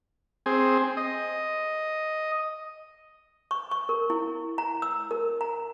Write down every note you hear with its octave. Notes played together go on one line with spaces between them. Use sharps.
C4 G#4
D#5
C#6
C#6
A#4
E4
A#5
E6
A#4
A#5